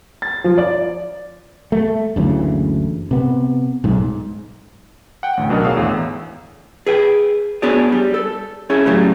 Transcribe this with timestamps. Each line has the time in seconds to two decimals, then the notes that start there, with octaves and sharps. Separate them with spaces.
0.22 A6
0.44 F3
0.58 D5
1.72 A3
2.16 F#1 D2 C#3 E3
3.11 C3 B3
3.84 B1 G#2
5.23 F#5 G5
5.37 A1 D2
5.49 B1 B2 D4 A#4 D#5
5.63 F#4 G#4 C#5 F5 D#6 E6
5.77 G#1 E2 A2
6.87 G#4 B4 G5
7.62 B3 D4 F#4 G#4 C#5 D5
7.92 G3
8.14 A4
8.70 C#4 E4 G#4 A4 C#5
8.86 A2 C#3 F#3 G3 A3